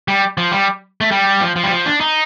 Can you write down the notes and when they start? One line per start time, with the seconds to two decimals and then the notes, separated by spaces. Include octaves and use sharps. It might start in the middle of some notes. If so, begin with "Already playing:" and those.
0.08 G3
0.38 F3
0.51 G3
1.01 A3
1.11 G3
1.41 F3
1.56 F3
1.64 G3
1.71 F3
1.86 D4
2.00 D#4